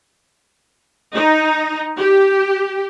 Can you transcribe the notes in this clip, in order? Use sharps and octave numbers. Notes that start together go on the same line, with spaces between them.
D#4
G4